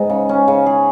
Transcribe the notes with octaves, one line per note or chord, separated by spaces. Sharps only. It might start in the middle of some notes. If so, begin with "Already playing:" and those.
Already playing: G#2 B3 D#4
C#3
C#4
C#3
G#4